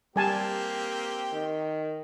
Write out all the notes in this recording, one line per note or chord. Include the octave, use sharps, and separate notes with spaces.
G3 A#3 C4 G4 G#5 A5
D#3